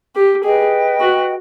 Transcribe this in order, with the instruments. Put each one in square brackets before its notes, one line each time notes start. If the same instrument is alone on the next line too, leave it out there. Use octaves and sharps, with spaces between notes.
[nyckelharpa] G4
[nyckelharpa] G#4 [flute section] B4 D#5 G5
[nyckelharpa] F#4